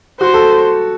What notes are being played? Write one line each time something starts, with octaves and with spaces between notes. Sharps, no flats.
F#4 C5
A4